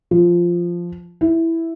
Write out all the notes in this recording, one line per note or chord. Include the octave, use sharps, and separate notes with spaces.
F3
E4